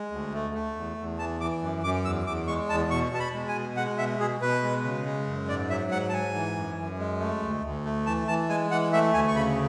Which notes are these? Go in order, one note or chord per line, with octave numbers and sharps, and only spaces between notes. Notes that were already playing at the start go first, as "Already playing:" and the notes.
Already playing: G#3
D2
A3
A3
E2
E2
E3 A5
E3 D6
F#2
F#2 D6
E2 E6
E2 D6
G#3 C#6
E2 A5
B2 C#6
B2 A5
B5
G#3
G#5
B2
G#3 F#5
B2 E5
B2 G#4
B2 B4
G#3
C#3
G#3
F#2
G#2 D5
F#3 E5
G#2 F#5
A5
G#2 G#5
E3
F#2
F#2
G#3
A3
D2
D2
A3
E3 A5
E3 A5
G#3 G#5
E3 F#5
A3 E5
D2 G#5
C#6
C#3 B5